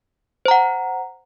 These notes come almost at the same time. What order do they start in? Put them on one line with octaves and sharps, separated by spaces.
C5 A#5 F#5